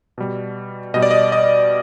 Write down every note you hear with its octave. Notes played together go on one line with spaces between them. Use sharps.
B2 G3
B2 G3 D#5
D5
D#5
D#5